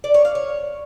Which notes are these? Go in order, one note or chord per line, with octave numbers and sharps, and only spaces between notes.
D5
C#5
F5
C#5